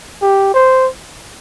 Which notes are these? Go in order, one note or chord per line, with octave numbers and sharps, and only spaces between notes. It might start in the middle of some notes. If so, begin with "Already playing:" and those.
G4
C5